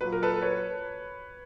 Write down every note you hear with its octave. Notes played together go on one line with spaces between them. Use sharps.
A#2 F#3 B4
A#4
A4 B4
B4 C#5